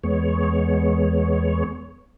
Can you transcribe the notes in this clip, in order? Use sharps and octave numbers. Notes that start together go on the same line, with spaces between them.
E2 G#3 B3 C#5